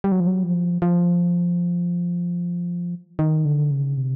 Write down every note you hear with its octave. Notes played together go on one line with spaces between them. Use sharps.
G3
F#3
F3
F#3
F3
F3
D#3
D3
C#3
C3